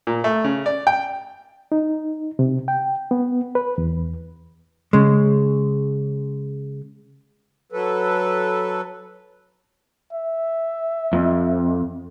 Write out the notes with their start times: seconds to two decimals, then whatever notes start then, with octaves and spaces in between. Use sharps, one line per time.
0.07 A#2
0.24 A3
0.44 C#3
0.66 D5
0.87 G5
1.72 D#4
2.39 C3
2.68 G5
3.11 B3
3.55 B4
3.78 E2
4.93 C#3 G#3
7.72 F#3 A4 B4
10.13 E5
11.13 F2